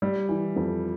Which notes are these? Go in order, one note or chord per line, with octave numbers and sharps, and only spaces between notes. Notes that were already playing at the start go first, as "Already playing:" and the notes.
G3
E3
F2